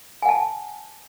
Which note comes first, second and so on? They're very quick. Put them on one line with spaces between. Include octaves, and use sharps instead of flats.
G#5 F#5 A5